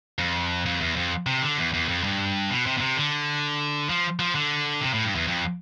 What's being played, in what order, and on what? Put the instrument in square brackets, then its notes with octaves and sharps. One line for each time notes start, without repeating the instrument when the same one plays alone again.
[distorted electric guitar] F2
F2
E2
F2
C3
D3
E2
E2
F2
G2
B2
C3
B2
C3
D3
F3
F3
D3
C3
A2
G2
E2
F2